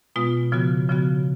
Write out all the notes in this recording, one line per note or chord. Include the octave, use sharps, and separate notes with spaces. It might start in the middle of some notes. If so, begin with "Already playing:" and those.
B2 G#3 B3 F4
C#3 F3 B3 F#4
C#3 F3 B3 F#4